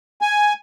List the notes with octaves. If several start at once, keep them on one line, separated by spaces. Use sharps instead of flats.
G#5